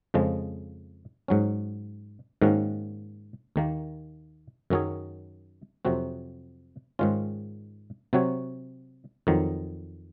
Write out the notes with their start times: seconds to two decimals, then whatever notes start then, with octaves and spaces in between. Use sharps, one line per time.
0.14 F2 C#3 F3 G#3
1.28 G#2 F#3 C#4
2.42 G#2 D#3 A#3 C#4 F#4
3.56 D#2 D#3 A#3
4.70 F#2 D#3 F#3 C#4 G#4
5.85 F2 C3 F#3 C4 F#4
6.99 G#2 D#3 G#3 C#4 F4
8.13 C3 F#3 C4 F#4 C#5
9.27 F2 D#3 F#3